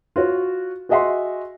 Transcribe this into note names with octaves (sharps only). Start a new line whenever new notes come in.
F4 F#4 C#5
F#4 G#4 D#5 E5 F#5 C6